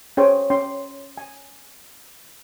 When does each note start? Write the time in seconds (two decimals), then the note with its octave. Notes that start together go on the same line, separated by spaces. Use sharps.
0.17 C#4 G#4 C5 C#5 G5 G#5
0.50 C#4 G5 C6 D6
1.17 G#5